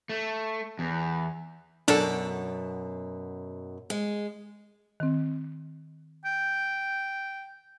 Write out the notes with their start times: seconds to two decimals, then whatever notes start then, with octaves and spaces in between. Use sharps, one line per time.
0.09 A3
0.79 E2
1.88 F#2 B2 D4 A4
3.90 G#3
5.00 D#3 C4
6.25 G5